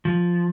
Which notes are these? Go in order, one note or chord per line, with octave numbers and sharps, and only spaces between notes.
F3